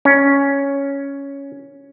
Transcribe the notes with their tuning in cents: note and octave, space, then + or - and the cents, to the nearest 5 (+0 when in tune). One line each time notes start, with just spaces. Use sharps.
C#4 +5